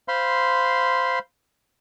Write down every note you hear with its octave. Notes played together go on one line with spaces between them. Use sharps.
C5 F5 B5 C6